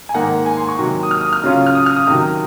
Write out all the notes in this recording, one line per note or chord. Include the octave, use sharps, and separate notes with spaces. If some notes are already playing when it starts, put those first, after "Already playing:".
G#5
G#2 D#3 A#3 F#5
G#5
C6
C#6
C3 D#3 F#3 A#3
D#6
F6
D#6
F6
C#3 F#3 C#4 F4
F6
D#6
F6
D#6
C3 D#3 F#3 D#6